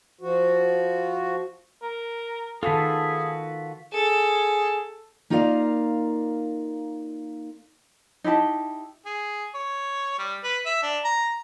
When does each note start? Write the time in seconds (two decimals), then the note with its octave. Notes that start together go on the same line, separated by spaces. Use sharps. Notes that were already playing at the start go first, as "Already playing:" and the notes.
0.21 F3 F#4
1.83 A#4
2.63 D#3 F4 F#4 G#4 A4 B4
3.93 G#4 A4
5.30 A#3 D#4 F4 A#4 D5 F5
8.24 D#4 E4 G4 A5
9.06 G#4
9.54 C#5
10.19 G3
10.44 B4
10.66 E5
10.83 D4
11.04 A#5